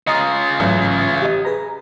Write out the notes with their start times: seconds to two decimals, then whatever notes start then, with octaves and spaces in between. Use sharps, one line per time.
0.07 C#3 F4 D#5 A#5 D#6
0.60 A1 G#2 F#3
1.22 G4 D#5
1.45 G#4 B4 A#5